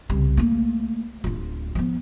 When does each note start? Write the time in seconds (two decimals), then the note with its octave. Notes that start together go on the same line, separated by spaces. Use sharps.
0.09 C2 C#3
0.37 A3 A#3
1.24 D1 F4
1.75 F3 B3